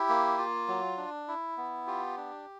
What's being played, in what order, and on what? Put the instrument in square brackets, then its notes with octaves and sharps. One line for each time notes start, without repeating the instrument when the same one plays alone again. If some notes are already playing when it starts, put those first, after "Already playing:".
Already playing: [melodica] E4 G4
A#3
F4
F#3
D4
E4
B3
F4 G4
D4